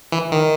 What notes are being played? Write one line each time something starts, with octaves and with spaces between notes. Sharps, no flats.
E3
D#3